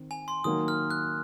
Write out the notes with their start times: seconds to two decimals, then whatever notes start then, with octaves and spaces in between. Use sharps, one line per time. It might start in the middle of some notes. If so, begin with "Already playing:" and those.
Already playing: D#3 C4
0.11 G#5
0.28 C6
0.44 D#3 F#3 A#3 D#4 D#6
0.68 F6
0.90 F#6